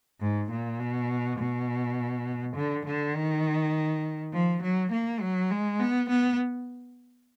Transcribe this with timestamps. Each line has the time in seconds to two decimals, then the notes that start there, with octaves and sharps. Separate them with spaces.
0.21 G#2
0.51 A#2
0.80 B2
1.39 B2
2.56 D3
2.86 D3
3.15 D#3
4.33 F3
4.62 F#3
4.92 A#3
5.21 F#3
5.50 G#3
5.80 B3
6.09 B3